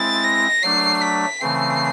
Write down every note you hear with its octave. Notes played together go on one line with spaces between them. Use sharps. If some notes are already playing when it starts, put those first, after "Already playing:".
Already playing: G#3 C4 E4 A6
A#6
F#3 A3 D4 C7
B6
C#3 E3 A3 C4 C7